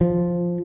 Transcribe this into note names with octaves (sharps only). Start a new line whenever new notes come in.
F3